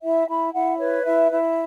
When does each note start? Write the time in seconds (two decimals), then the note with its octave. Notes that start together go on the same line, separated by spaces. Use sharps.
0.02 E4 E5
0.28 E4 B5
0.54 E4 F#5
0.79 B4 C#5
1.05 E4 E5
1.31 E4